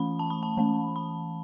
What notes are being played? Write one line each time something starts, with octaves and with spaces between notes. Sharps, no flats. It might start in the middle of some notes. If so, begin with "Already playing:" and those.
Already playing: E3 A3 C#4 B5
A5
B5
A5
E3 A3 C#4 A5
B5